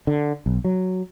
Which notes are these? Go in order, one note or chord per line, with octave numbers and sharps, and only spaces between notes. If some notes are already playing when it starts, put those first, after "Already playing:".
D3
B1
F#3